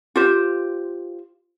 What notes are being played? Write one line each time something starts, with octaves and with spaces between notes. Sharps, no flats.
F4 G4 C5